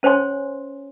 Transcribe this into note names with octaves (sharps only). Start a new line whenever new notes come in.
C#4 C5 C#5 G#5 C6